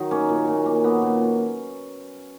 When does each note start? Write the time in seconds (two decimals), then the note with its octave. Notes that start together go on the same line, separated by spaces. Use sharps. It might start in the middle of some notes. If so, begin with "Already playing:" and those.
Already playing: D#3 F#3 D#4
0.11 A#3 C#4
0.29 A#2
0.47 A#2
0.66 A#3
0.84 A#3 B3
1.02 A#2